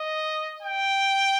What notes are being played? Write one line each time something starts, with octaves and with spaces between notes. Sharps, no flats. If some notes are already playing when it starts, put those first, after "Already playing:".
Already playing: D#5
G5